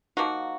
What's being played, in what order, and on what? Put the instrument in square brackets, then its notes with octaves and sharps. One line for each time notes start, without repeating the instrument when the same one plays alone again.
[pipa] F3 A#3 D#4 F#4